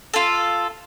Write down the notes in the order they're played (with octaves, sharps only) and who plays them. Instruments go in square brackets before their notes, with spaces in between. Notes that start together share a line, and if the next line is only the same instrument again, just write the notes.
[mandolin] F4 A4